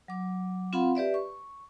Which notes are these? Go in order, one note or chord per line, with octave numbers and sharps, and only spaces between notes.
F#3 D6
C4 F4 F5 F#5 B5 C6
G4 B4 D5 E5
C#6